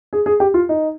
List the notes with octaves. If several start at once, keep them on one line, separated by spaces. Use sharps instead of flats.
G#4
G#4
G4
F4
D#4